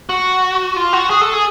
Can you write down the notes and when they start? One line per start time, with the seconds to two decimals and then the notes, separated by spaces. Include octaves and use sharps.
0.09 F#4
0.76 F4
0.93 F#4
1.10 G#4
1.21 A4
1.33 G#4